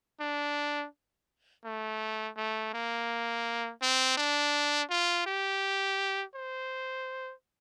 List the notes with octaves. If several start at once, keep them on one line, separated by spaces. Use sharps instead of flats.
D4
A3
A3
A#3
C4
D4
F4
G4
C5